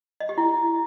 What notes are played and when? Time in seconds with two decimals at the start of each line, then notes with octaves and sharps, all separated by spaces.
0.20 D#5
0.29 G4
0.38 E4